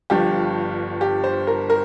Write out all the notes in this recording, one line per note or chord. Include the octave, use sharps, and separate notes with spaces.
G1 G2 F3 G4
G4
C5
A#4
A#4